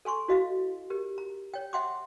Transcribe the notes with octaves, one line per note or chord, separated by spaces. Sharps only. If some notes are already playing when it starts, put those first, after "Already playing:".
A4 G#5 C6 C#6
E4 F#4 D#5 F5
G4 A#4
A#5
C#5 G5
E5 F#5 G5 C6 D6